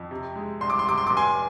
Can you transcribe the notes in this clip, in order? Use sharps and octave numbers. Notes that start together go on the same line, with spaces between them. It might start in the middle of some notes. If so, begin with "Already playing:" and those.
Already playing: F2
C3
G#3
C2 C6
D6
C6
C3 D6
C6
F1 D6
G#5 C6